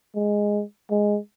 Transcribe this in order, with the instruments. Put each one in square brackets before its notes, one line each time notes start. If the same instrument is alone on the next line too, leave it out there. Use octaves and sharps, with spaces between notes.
[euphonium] G#3
G#3